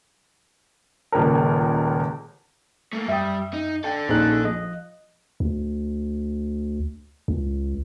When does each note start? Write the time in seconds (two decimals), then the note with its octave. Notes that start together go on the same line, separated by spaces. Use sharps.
1.12 D#1 C#2 A#4
2.93 A3 A#3
3.08 F#2 G3 E5 G5 D#6
3.53 D#4
3.84 D4 A4 G5
4.08 A#1 C#4 D#4 G#4 F#6
4.45 F3 D#5
5.40 D2
7.28 C#2